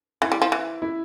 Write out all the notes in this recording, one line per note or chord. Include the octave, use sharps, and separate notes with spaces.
E3 E4
G3
F3
E3
E4